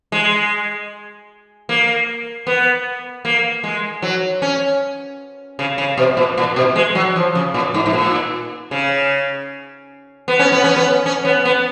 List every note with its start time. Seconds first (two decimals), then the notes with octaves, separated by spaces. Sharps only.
0.12 G#3
1.69 A#3
2.47 B3
3.25 A#3
3.63 G#3
4.02 F#3
4.42 C#4
5.59 C#3
5.78 C#3
5.97 B2
6.17 A#2
6.38 A#2
6.56 B2
6.76 G#3
6.95 F#3
7.16 F3
7.35 C#3
7.54 A#2
7.74 G#2
7.86 G#2
7.93 A#2
8.71 C#3
10.28 B3
10.39 C#4
10.52 B3
10.64 C#4
10.76 B3
11.06 C#4
11.25 B3
11.45 B3